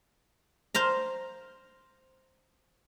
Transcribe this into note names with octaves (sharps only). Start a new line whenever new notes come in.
C5 F5 A#5